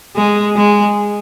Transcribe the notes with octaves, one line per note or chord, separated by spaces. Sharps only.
G#3
G#3